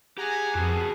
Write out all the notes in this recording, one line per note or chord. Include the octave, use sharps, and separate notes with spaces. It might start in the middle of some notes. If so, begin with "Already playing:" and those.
G4 G#4 F#5 G#5 A#5
F2 B3 F#4 G#4 G#5 A5